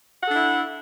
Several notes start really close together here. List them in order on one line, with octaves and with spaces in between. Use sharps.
F#5 A4 D4 E4